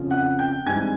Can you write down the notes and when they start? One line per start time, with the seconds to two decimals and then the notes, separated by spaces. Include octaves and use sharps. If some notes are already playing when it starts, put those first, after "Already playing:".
Already playing: F2 C#3 F3
0.11 F#5 F#6
0.39 G5 G6
0.66 G#2 E3 G3 C4 G#5 G#6